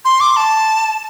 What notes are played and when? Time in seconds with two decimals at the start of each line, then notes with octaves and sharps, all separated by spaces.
0.05 C6
0.21 D6
0.36 A5